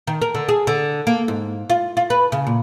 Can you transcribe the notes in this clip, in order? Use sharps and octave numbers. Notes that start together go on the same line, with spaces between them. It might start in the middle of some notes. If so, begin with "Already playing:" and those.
D#3
A#4
D3
G#4
D3
A#3
G#2
F4
F4
B4
C#3
A#2